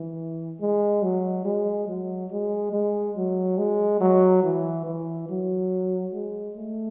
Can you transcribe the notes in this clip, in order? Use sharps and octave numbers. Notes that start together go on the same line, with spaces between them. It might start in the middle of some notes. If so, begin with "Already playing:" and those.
Already playing: E3
G#3
F#3
G#3
F#3
G#3
G#3
F#3
G#3
F#3
E3
E3
F#3
G#3
A3